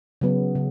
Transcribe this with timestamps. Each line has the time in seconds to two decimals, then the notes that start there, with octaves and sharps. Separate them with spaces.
0.21 C#3 F#3 B3
0.55 C#3